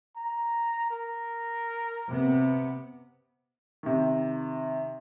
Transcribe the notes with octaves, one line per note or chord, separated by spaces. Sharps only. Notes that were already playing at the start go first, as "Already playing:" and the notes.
A#5
A#4
C3 B3
C3 D#3